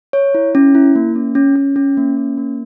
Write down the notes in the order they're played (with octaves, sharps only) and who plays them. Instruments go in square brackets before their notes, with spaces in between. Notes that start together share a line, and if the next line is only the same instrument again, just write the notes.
[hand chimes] C#5
E4
C#4
E4
A#3
C#4
C#4
C#4
C#4
A#3
C#4
A#3